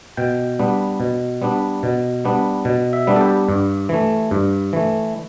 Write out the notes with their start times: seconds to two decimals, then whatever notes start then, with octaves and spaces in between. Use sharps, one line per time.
0.17 B2 G5
0.59 G3 B3 D4
1.00 B2
1.42 G3 B3 D4
1.83 B2
2.25 G3 B3 D4
2.65 B2
2.93 E5
3.07 G3 B3 D4
3.16 A4
3.21 G4
3.49 G2
3.89 E3 A3
4.31 G2
4.73 E3 A3